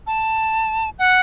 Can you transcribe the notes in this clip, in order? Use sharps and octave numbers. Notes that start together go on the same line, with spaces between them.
A5
F#5